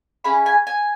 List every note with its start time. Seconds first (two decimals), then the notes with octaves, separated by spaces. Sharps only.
0.24 C#4 E4 G#4 B5
0.46 G#5
0.67 G#5